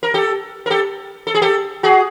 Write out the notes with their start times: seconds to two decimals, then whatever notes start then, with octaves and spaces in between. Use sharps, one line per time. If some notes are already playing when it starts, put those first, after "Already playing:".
0.03 A#4
0.14 G4 A4
0.66 A#4
0.70 G4 A4
1.27 A4
1.35 G#4
1.42 G4 A4
1.83 F#4 G#4